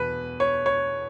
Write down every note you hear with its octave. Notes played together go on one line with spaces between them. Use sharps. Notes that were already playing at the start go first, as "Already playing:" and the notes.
Already playing: E2 B2 B4
C#5
C#5